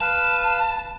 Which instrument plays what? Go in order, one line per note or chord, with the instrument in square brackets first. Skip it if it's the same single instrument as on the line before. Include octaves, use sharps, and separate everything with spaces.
[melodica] B4 F5 [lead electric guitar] A5